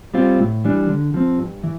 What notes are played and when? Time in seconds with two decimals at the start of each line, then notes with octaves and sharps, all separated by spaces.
0.14 G3 C4 F4
0.40 A2
0.64 E3 G3 D4
0.89 D3
1.14 F3 C4
1.38 G2
1.63 E3